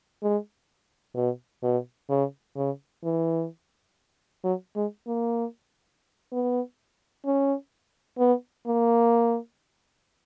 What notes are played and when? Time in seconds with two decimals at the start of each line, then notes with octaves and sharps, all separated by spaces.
0.22 G#3
1.15 B2
1.63 B2
2.09 C#3
2.56 C#3
3.04 E3
4.44 F#3
4.76 G#3
5.07 A#3
6.32 B3
7.26 C#4
8.19 B3
8.67 A#3